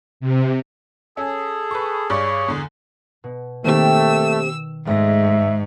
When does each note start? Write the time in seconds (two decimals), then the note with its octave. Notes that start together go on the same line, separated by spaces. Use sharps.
0.20 C3
1.17 C#4 G#4 A4
1.71 B4 C#6
2.10 G2 C#5 D5
2.48 E2 D3
3.24 B2
3.64 D#3 A3 A#3 C4 G4 E6
4.87 G#2 G#3 A3 E5 A6 A#6